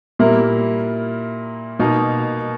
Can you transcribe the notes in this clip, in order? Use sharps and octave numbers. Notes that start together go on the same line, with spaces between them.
A#2 G3 A#3 E4 A#4
B2 A#3 D#4 A#4